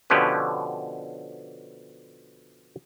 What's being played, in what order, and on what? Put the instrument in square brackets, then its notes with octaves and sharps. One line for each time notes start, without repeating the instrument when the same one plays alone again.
[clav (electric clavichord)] B2 D3 F3 C#4 G4 B4